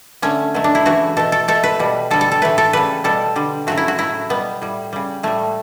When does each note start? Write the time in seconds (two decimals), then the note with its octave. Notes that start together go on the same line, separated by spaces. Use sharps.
0.22 D3 A3 C#4
0.54 B2 F#3 A3
0.64 D4
0.75 E4
0.85 C#3 E3 A3 F#4
1.17 B2 A3 A4
1.32 A4
1.48 B2 A3 A4
1.64 B4
1.79 B2 G3
2.10 D3 G3 A4
2.21 A4
2.32 A4
2.42 A2 E3 A3 B4
2.58 A4
2.73 C#3 G3 B4
3.04 B2 G3 A4
3.36 D3 G3
3.67 C#3 F#3 A3 F#4
3.77 E4
3.88 F#4
3.98 A2 F#3 A3 E4
4.30 B2 G3 B3
4.62 A2 G3
4.93 C#3 G3
5.23 A2 G3 A3